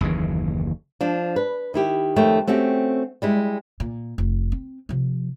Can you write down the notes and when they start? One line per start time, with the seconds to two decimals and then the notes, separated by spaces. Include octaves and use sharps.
0.01 F#1 D#2 C#3 E3
1.01 F3 D4
1.36 B4
1.74 D#3 E4 G4
2.16 F2 D#3 A3 C#5 G5
2.47 A3 C4 C#4 F#4 G4
3.22 G3 G#3 E4
3.80 A#2
4.18 F1
4.52 C4
4.89 C3 F3